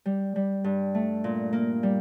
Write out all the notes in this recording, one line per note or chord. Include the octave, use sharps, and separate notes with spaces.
G3
G3
G2
A3
A#2
A#3
G3